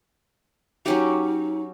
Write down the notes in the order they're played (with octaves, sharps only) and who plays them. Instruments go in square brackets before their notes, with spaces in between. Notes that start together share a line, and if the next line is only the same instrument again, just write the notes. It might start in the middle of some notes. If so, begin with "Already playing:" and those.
[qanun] F#3 C#4 G4 [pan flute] D#4